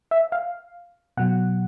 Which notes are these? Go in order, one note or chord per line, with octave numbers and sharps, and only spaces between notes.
E5
F5
B2 F#3 F#5